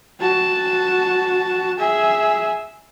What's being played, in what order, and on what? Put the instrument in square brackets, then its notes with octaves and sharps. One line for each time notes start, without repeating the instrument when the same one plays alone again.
[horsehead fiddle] F#4 A5
G#4 E5